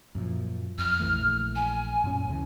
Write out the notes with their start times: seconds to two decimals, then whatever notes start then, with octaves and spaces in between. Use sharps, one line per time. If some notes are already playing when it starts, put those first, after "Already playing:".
0.15 F#2 A#2 F3
0.78 F2 F6
0.99 A#1 E3 A3
1.56 G#5
2.04 F#2 A#2 C#4
2.28 D2 C#3 E3